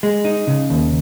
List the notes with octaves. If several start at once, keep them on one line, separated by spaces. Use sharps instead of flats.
G#3
D#4
C#3
D#2